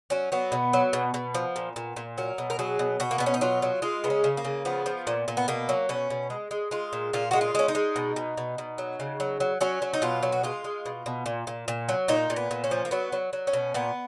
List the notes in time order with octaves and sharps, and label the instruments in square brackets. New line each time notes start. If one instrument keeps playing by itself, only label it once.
[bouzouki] F#3 C#4
F#3 B3
B2
F#3
B2
B2
F3
A#2
A#2
A#2
F#3 A#4
B2
A#4
F#3 G#4
B2
B2 F#4
A#3
B2 B3
C#4
D#4
F#3 F4
F#3
G#3 F4
C#3 B3
C#4
C#3
A#3
C#3
F3 B3
F3
A#2
A#2
B3
B2 A#3
F#3
B2 C#4
B2
G#3
G#3
G#3 F4
A#2
A#2 F4
G#3 F#4
F4
G#3 C#4
D#4
G#3
B2
B2
B2
B2
F#3
C#3
F#3
F#3
F#3 C#4
F#3
D#4
B2 F4
F#3
F#4
G#3 F4
G#3
B2
B2
A#2
A#2
A#2
F#3
A#2 D#4
A#2
B3
A#2
C#4
F3
A#3
F#3 B3
F#3
F#3
C#4
B2
A#2 B3